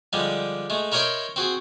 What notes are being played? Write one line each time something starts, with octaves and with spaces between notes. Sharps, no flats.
D3 F3 G3 G#3
G#3 A3
E4 A#4 C#5 D#5 G5 C6
C4 F#4 G#4